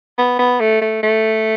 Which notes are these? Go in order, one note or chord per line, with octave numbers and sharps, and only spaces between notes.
B3
B3
A3
A3
A3